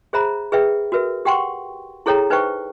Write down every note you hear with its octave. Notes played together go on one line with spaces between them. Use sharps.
G#4 C5 E5 A#5 B5
G#4 B4 E5 G5
F#4 A#4 B4 E5
G4 F#5 G5 C6 C#6
E4 G#4 A4 C#5 G5 A#5
D#4 B4 C5 E5 G5 C#6